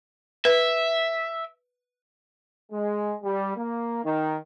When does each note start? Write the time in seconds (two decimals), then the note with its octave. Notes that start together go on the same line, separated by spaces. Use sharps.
0.45 B4 E5
2.72 G#3
3.23 G3
3.56 A#3
4.04 D#3